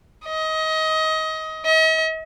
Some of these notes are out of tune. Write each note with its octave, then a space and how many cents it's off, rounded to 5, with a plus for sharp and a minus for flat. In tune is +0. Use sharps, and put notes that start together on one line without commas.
D#5 +25
D#5 +45